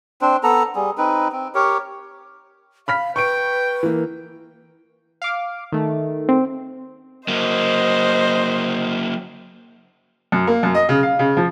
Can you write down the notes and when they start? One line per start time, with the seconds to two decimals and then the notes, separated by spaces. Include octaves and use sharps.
0.21 C4 D4 C5
0.43 B3 A4 A#5
0.76 G3 G#4
0.98 C4 D#4 B4
1.32 C4
1.55 G4 A#4 C#5
2.88 F5 B5 F6 B6
3.16 B4 G5 C#6 D7
3.83 E3 A#3
5.22 F5 D6
5.72 D#3 A3
6.29 C4
7.28 F#3 A#3 C5 D#5
10.32 F#2
10.47 A#3
10.63 F#2
10.75 D#5
10.89 C#3
11.03 F5
11.19 C#3
11.37 F3